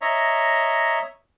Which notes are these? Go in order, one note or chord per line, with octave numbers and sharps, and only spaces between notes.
C#5 D#5 E5 A#5